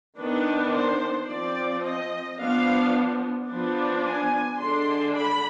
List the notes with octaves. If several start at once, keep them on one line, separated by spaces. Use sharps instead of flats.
D#3 B3 D4 B4
C5
F3 C4 D5
D#5
F3 B3 D4 F5
F3 B3 D4
G#5
D3 G#3 D4 C6
B5